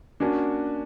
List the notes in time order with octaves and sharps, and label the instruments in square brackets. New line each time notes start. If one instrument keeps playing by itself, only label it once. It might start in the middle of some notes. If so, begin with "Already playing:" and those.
[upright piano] A#3 C#4 F#4 [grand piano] D4